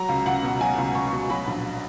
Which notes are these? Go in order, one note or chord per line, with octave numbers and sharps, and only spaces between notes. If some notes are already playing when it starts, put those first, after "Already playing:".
Already playing: F#3 A#5
C#2
C#2 F#5
B2
F#3 G#5
C#2
C#2 C#6
B2
F#3 B5
A#1